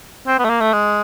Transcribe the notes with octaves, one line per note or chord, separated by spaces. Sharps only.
C4
B3
A3
A#3
A3
G#3